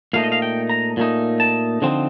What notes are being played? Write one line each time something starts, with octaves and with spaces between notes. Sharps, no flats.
A#2 A3 D#4 F5
D#5
F5
G5
A#5
A#2 A3 D#4
A5
D3 F3 C4 D#4